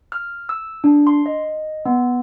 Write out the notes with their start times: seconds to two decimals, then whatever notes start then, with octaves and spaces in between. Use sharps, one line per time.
0.12 F6
0.49 E6
0.84 D4
1.07 C6
1.26 D#5
1.85 B3